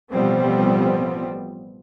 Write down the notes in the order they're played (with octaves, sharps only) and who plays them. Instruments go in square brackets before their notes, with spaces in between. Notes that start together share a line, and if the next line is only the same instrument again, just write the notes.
[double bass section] A1 B2 F3 G3 B3 C4